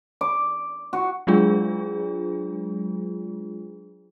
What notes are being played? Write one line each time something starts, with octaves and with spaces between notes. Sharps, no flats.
D6
F#4
F#3 G#3 D4 F4 G#4